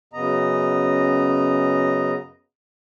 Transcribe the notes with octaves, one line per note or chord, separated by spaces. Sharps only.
F#2 C#3 B3 D#5 A#5